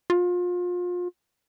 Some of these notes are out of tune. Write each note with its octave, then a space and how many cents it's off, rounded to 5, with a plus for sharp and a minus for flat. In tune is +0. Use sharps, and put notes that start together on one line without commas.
F4 +30